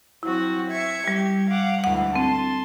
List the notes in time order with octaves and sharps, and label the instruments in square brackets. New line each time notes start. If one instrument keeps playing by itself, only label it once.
[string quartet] F#3 C4 F#4 [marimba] E4
[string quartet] E5 C#6 G#6
[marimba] G3 [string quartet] G4
[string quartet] F5 F#5 D6
[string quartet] D2 G#2 E3 [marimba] F#5
[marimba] C4 [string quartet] A5 C6